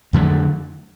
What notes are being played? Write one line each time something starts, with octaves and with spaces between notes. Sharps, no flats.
F2 D3 F#3 A3